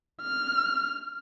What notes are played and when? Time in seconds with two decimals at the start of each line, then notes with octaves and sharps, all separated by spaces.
0.22 F6